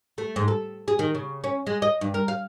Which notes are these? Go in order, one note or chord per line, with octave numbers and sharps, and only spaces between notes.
A3
G#2
A4
G#4
D#3
C#3
C#4
G#3
D#5
G2
A#4
F5